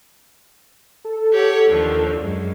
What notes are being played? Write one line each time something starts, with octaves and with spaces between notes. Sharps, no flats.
A4
G4 C#5 F#5
D#2 D3 F3
F#2 G#3